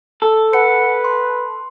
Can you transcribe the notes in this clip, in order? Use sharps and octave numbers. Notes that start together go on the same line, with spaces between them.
A4
B4 F#5 C#7
C6